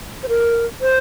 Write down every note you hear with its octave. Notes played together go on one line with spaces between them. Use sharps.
C5
A#4
C5